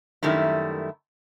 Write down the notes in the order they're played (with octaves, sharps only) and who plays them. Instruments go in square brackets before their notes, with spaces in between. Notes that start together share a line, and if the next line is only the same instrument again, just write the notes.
[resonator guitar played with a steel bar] F#2 D#3 G3 A3 E4